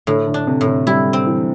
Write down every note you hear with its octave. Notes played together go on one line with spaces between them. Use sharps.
A2 D3
D3
D4
C3
A2
D3
G3 E4
C4
E3